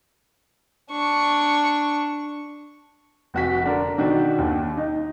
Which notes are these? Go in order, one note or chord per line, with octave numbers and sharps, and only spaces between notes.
D4 C#6
F1 F#4 B6
D3 D4 A#4
B2 D#3 D4 F#4
D#2
D#4